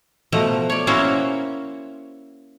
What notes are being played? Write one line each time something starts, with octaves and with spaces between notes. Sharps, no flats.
B2 F3 A3 F#5 A#5
C#5 D5
A#3 C#4 E4 F#4 C5 C#5